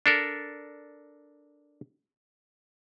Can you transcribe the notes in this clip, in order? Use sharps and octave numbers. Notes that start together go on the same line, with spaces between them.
D4 A4 A#4